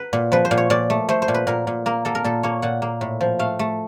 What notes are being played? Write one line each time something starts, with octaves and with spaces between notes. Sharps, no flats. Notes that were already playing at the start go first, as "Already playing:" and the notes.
Already playing: B4
A#2
F3 B4
C5
A#2
C#5
A#2 D5
A3
A3 C5
C5
A#2
B4
A#2 A#4
A#2
A#3 A#4
A#3 A4
A#4
A#2 A4
A#3 C#5
A#2 F#5
A#3
A2
F3
A3 F5
A3